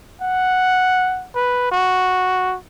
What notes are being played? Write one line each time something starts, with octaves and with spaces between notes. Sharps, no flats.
F#5
B4
F#4